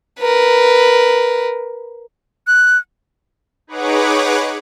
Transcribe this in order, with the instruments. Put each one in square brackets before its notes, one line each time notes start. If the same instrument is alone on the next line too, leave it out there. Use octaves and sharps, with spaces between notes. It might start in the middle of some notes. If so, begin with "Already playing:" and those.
[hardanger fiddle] A#4 B4
[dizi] F#6
[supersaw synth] D#4 G#4 B4 C#5 F#5 D6